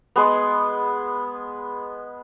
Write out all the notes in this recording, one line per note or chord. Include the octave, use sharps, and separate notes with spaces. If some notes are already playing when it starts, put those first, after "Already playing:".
G#3 B3